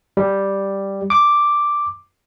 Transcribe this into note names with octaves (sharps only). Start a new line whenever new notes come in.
G3
D6